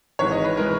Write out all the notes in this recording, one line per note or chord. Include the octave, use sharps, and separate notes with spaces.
G#1 G#2 E3 G#3 C#5
D#5
B4
E3 G#3 A#4